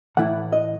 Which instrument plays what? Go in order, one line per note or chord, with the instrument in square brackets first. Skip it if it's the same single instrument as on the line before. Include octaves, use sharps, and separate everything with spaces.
[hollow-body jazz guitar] A2 E3 A3 E4 F#5
D#5